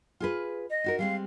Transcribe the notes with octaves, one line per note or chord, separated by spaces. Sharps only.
F4 G#4 B4
D#5
D#4 F#4 A#4
G3 G#3 C4 F5